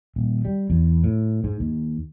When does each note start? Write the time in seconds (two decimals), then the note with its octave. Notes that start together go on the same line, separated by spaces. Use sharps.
0.16 D#1
0.45 G3
0.70 E2
1.04 A2
1.44 G#2
1.60 D#2